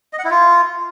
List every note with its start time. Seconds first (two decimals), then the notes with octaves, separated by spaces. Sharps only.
0.13 D#5
0.19 F#5
0.25 E4
0.30 F4